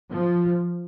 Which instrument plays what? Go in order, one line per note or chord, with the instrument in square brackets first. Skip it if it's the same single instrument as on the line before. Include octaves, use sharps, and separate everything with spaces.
[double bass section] F3